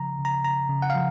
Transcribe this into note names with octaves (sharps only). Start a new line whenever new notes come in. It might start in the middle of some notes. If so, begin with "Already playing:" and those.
Already playing: C#3 F3 A#5
C#3
A#5
C#3 A#5
C#3
F#5
F5
F3